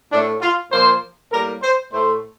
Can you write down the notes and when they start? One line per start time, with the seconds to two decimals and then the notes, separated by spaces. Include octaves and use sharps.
0.12 A2 A3 D4
0.41 F4
0.72 A#2 F3 A#3 C5
1.32 A2 G3 A#3 A#4
1.63 C5
1.93 A2 A3 C5